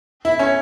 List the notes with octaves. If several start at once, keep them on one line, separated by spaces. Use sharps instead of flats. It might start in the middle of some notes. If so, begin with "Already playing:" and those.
E4
C#4